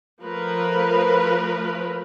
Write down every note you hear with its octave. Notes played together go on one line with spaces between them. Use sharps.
F3 A3 A#4 B4